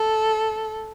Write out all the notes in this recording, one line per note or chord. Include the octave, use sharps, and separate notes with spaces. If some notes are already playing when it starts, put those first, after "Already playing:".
Already playing: A4